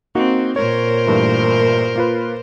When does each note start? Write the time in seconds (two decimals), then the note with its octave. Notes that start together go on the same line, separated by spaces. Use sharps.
0.15 A#3 C4 D#4 F#4
0.56 A#2 A#4 C5 C#5
1.07 G2 E3 A3
1.95 A#3 F4 B4